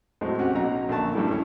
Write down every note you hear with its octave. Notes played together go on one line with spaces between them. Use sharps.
A2 F#3 G#3 C4
C3 C#4 F#4 G4
B1 F#3 C#4 D#4 F#4 A#5
A#1 D3 A3 A5 C#6
G2 C#3 G3 A3 E4
A3 C#4 E4